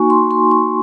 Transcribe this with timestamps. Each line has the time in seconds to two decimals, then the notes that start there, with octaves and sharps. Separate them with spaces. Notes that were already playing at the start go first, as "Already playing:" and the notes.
Already playing: A#3 D#4 F#4 G#5 C#6
0.10 C6
0.31 C6
0.51 C#6